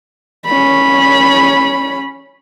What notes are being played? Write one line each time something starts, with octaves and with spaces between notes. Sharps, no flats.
C#4 B5